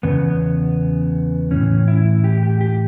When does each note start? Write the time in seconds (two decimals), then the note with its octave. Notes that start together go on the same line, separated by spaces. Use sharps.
0.03 E2 C#3 B3
1.51 A2 E3 C#4
1.88 E4
2.24 G4
2.43 G4
2.61 G4